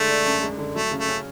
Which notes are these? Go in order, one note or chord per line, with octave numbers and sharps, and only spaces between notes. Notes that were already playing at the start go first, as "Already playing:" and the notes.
Already playing: D3 G#3 A3
D4
F#2
G#3
D3
F#3 A3
C#3
A3
C#4